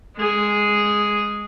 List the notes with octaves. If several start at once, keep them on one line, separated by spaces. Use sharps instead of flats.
G#3 G#4